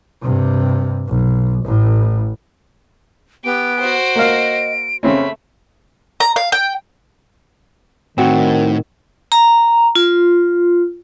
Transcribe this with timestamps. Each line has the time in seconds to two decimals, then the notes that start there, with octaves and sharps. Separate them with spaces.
0.22 G2 C3
1.08 B1
1.66 A1 A2
3.44 B3 G4 D7
3.80 F#4 C5
4.16 A#3 A#4 D#5 F5
5.03 C#3 A3 A#3 C4 C#4 B5
6.20 A#5
6.36 F5
6.52 G5
8.18 A2 D#3 C4 F#4
9.32 A#5
9.95 F4